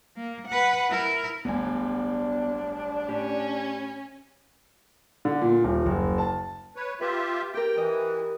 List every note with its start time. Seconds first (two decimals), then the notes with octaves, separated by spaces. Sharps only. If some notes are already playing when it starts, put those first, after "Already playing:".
0.17 A#3
0.48 B4 F#5
0.90 E4 A#4
1.45 D1 G1 D2 B3 D4 G#5
3.09 A2 C#4 G4
5.25 D3
5.41 A#2
5.64 D#1
5.86 F#1
6.18 A5
6.76 B4 C#5
7.01 F4 G4 B4 E5
7.54 G4 A#4 G5
7.77 E3 D#5